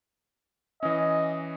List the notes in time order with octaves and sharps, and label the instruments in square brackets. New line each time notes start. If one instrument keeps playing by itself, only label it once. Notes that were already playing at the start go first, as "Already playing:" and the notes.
[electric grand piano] E3 C#4 [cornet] D#5